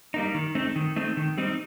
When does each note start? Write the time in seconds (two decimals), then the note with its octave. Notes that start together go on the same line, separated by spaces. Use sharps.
0.14 G3 A#3 D#4
0.34 D#3
0.55 A3 C4 D#4
0.76 D#3
0.96 A3 C4 D#4
1.17 D#3
1.38 G3 C4 D#4